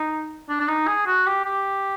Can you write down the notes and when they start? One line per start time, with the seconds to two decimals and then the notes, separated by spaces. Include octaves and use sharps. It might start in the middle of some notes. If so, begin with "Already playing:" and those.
Already playing: D#4
0.49 D4
0.60 D4
0.68 D#4
0.87 G#4
1.06 F#4
1.26 G4
1.45 G4